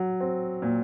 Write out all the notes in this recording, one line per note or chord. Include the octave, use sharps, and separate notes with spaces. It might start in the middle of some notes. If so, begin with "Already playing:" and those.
Already playing: F#3
C4
A#2